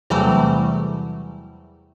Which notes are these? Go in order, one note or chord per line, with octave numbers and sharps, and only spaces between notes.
E2 C3 E3 F#3 G3 A3